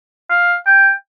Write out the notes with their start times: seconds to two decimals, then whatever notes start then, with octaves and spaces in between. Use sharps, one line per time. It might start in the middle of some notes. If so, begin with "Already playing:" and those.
0.30 F5
0.66 G5